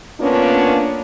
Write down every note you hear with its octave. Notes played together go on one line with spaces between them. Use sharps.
A#3 B3 C#4 D4 F4